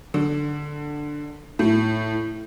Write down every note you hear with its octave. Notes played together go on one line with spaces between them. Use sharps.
D3
A2